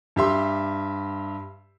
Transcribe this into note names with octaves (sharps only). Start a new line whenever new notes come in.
G2 G4 E5 C6